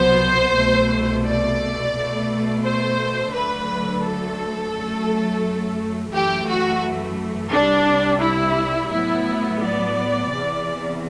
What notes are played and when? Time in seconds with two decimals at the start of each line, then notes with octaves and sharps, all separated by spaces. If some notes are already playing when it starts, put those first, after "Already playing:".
Already playing: C2 B2 F#3 B3 C5
0.56 C2 B2 A3
1.25 D5
1.95 B2 A3
2.64 C5
3.34 D2 D3 F#3 A3 B4
4.03 A4
4.74 F#2 F#3 A3
6.12 F#2 E3 A3 G4
6.48 F#4
7.52 C2 C3 G3 D4
8.22 E4
8.91 A2 F#3 B3 E4
9.61 D5
10.30 E2 C3 E3